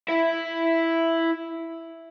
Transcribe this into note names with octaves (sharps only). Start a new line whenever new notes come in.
E4 E5